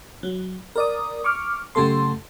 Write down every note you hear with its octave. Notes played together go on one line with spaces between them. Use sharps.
F#3
A#4 D5 D#6
C#6 D6 F6
F#2 C#3 A3 G4 A4 C6